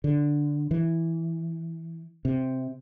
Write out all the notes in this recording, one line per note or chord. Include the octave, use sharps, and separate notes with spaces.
D3
E3
C3